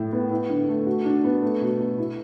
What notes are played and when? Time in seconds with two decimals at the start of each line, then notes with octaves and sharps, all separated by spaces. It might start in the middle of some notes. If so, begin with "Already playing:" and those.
Already playing: A2 E4
0.13 B3
0.31 E4
0.50 D3
0.69 A3
0.86 F#4
1.05 D4
1.24 B3
1.43 A3
1.62 B2
1.80 B2
1.98 E4